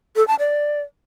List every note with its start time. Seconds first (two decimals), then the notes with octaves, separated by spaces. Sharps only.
0.16 A4
0.28 A5
0.39 D5